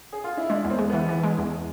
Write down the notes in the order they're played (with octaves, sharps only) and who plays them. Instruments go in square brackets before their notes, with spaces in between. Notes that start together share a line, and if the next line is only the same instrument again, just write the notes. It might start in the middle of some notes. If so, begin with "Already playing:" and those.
[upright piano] G#4
F4
E4
[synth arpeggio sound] G#3 [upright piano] D4
[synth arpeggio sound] E2
[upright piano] C4
[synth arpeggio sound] G#3
[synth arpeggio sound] E3 [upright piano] B3
[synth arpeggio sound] E3
G#3
E2